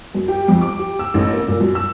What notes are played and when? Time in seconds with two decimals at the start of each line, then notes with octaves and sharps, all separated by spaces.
0.15 F#2
0.28 G4
0.48 F2
0.61 D6
0.79 G4
0.99 E6
1.14 A1
1.33 A#3
1.48 A#2
1.61 F#2
1.75 E6